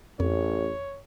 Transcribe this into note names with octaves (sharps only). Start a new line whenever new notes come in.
A1 F2 C#5